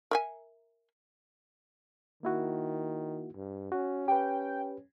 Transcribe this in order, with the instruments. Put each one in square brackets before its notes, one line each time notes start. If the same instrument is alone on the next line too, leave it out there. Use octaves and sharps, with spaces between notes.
[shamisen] A#4 E5 G#5
[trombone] D#3 [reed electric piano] A#3 E4 F#4
[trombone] G2
[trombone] C#4 [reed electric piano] F#4
[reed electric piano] G4 B4 [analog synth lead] G5